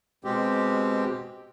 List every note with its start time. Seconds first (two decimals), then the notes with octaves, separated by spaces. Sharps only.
0.24 B2 G#3 C4 G4